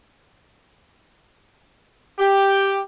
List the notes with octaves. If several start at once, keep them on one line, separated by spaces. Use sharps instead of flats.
G4